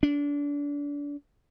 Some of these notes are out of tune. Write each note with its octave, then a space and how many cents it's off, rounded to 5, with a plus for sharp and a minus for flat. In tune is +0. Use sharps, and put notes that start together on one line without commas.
D4 -30